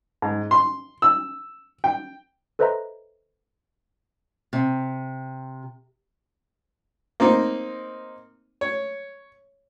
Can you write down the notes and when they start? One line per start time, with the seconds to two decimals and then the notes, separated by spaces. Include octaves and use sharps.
0.22 G#2
0.51 C6
1.02 E6
1.84 G5
2.59 A4 B4 C5 D#5 E5 A#5
4.53 C3
7.20 A#3 C4 D#4
8.61 C#5